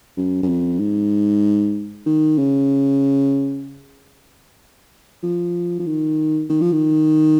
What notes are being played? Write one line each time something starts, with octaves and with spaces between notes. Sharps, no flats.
F#2
F#2
F2
G#2
D#3
C#3
F3
F3
D#3
D#3
F3
D#3